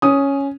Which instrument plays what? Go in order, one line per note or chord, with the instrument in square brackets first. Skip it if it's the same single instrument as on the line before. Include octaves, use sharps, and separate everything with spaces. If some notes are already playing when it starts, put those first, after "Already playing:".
[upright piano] C#4 D#6